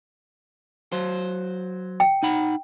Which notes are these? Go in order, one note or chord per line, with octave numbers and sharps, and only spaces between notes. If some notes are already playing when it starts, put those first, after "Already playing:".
F#3 C5
G5
D#4 F#5 B5